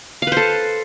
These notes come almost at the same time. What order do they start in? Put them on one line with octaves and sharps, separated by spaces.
F5 B4 C5 A4